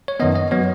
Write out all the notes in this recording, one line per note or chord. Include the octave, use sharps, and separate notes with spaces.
C#5
F#2 D#3 B3 D#5
D#5
F#3 B3 C#5